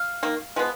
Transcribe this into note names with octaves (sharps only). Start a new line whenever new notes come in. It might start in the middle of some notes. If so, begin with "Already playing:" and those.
Already playing: F5
D#3 A#3
F3 G#3 B3